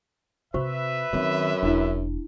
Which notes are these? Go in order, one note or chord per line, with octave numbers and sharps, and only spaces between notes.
C3 F#4 B4 C5 E5 C#6
F#2 D#3 C4
E1 D4 E4